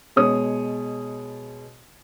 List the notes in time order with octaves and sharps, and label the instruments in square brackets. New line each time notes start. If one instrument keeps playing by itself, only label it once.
[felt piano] B2 G#3 C#5 D#6